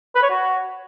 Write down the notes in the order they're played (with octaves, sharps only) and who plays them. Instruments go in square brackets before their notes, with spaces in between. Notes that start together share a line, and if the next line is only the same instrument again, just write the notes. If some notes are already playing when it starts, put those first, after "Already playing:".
[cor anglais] B4
C#5
F#4